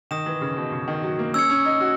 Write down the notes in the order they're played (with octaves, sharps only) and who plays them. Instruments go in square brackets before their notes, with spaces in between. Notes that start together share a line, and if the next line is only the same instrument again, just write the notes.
[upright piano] D#3 [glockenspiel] D#6 A#6 E7
[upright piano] E3
C#3
B2
C#3
D#3
F#3
A#3
[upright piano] C#4 [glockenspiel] E6 G#6 C#7
[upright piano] C#4
D#4
F#4